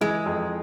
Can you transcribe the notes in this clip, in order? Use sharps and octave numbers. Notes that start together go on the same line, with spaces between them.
E3 G#3
F2